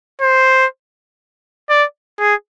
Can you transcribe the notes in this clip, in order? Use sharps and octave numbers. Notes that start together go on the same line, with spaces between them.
C5
D5
G#4